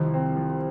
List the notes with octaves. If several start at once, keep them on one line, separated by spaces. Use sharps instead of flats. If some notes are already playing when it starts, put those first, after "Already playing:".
Already playing: C2 D#3 F3
C4
F3